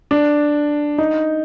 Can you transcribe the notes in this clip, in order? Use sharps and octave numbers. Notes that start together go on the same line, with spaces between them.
D4
D#4